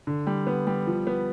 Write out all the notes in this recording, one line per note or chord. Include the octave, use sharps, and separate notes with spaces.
D3
G3
B3
G3
F3
B3